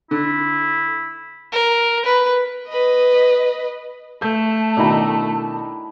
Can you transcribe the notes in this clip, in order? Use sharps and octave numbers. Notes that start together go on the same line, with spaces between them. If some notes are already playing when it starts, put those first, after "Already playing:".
D3 E4
A#4
B4
B4 D#5
A3 A5 G6
B2 D#3 D4 E4 A#5